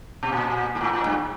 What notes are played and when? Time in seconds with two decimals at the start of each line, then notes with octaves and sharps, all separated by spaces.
0.23 B2
0.32 A#2
0.75 G#2
0.81 A2
0.93 A2
1.06 G2